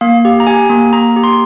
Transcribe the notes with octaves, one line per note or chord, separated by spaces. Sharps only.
A#3 F5
G4
A#5
G4 G#5
A#3
A#3 A#5
G4
C6